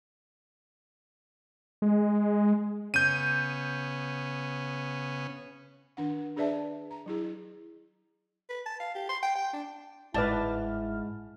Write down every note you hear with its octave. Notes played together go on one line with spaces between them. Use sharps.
G#3
C#3 B3 C#4 G6 D#7
D#3 D4 F#5
D4 G#4 B4 D5 E5 A5
A#5
F#3 E4 G#4
B4
A5
F5
G4
C6
G5
G5
D4
G1 G#2 E4 B4 D5 A5 F6